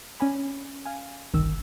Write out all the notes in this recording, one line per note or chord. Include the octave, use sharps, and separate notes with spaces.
C#4 D5 G#5 B5
F5 G#5
G1 C2 D#3 E6